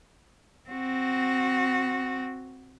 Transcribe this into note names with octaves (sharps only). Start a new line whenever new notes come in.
C4 F#4